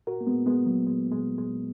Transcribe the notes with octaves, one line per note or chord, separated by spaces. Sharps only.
A#2 F#4 A#4
A#3
G#3 B3
A#2
G#3 B3
A#2
F#3 A#3
A#2 G#3
A#2 G#3
A#2 G#3